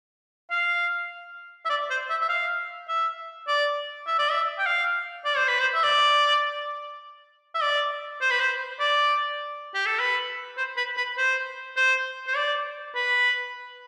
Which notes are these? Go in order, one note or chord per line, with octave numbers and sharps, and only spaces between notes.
F5
E5
D5
C5
E5
E5
F5
E5
D5
E5
D5
E5
G5
F5
D5
C5
B4
C5
E5
D5
E5
D5
C5
B4
C5
D5
G4
A4
B4
C5
B4
B4
C5
C5
C5
D5
B4